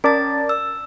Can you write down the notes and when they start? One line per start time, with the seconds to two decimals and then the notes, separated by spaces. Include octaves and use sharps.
0.04 C#4 A#4 D5 A5 A6
0.49 E6